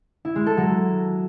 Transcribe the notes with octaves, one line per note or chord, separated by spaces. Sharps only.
E4
G#3
A4
F#3